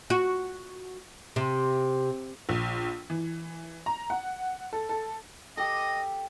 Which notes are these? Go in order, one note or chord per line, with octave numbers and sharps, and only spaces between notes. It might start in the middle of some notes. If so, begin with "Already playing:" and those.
F#4
C3
A#1
E3
A#5
F#5
A4
A4
G4 A4 D#5